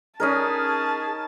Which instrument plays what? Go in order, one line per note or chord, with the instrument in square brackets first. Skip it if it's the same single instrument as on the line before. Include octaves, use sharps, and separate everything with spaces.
[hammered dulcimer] C#4 D#4 A#4 [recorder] G#4 [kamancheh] A5